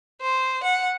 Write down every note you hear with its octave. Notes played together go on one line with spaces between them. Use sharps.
C5
F#5